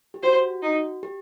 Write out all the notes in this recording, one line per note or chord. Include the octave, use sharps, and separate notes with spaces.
G4
F#4 C5
D#4
G4